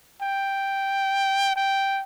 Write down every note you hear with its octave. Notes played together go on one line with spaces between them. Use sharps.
G5
G5